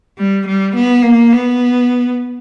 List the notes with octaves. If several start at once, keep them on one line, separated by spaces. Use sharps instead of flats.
G3
G3
B3
A#3
B3